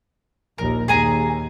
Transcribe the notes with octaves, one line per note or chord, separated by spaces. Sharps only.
A#1 D#2 A#4
D#2 G#4 G#5 A#5